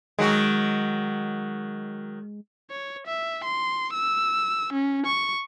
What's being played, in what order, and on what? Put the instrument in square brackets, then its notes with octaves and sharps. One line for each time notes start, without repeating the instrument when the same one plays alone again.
[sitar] D#3 F#3 F#4 [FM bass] G#3
[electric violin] C#5
E5
C6
E6
C#4
C#6